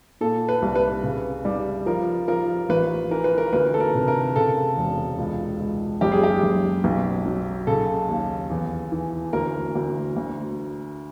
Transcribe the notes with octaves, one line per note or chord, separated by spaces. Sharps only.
A#2 A4
B4
C2
B4
C#3
G3
F3 A#4
F3 A#4
A1 B4
E3 A#4
B4
A#4
D2 B4
A4
A#4
C3
A#4
C#3 A4
E1
C#2
C#2
F#1 G4
G#4
G4
F#1
B1
F#3
C#3 A4
D#2
E2
E3
D2 A#4
D2
D2